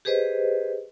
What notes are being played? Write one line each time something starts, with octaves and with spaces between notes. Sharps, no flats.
G4 G#4 B4 C5 D#5